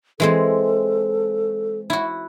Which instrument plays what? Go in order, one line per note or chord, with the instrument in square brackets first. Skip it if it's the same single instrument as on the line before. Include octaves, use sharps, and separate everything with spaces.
[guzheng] E3 G#3 C4 [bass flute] A4
[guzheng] E4 F#4